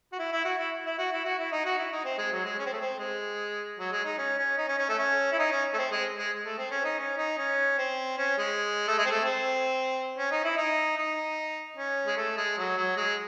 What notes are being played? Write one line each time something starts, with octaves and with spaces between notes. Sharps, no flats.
F#4
E4
E4
F#4
E4
E4
F#4
E4
F#4
E4
D#4
F#4
E4
D#4
C4
G#3
F#3
G#3
C#4
C4
A3
C4
G#3
F#3
G#3
D#4
C#4
C#4
D#4
C#4
C#4
A3
C#4
E4
D#4
C#4
A3
C4
G#3
G#3
A3
C4
C#4
D#4
C#4
D#4
C#4
C4
C#4
G#3
A3
G#3
C4
A3
C4
C#4
D#4
E4
D#4
D#4
C#4
G#3
A3
G#3
F#3
F#3
G#3